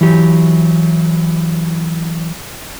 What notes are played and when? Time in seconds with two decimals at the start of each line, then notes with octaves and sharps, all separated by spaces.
0.01 E3 F#3 G4